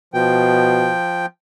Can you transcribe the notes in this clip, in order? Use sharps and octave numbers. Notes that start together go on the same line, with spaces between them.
B2 F3 G5